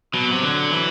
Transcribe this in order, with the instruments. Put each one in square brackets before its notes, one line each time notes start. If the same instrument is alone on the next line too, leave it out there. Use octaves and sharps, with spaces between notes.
[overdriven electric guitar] B2 [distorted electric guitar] F#3
[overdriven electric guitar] C3
D3
E3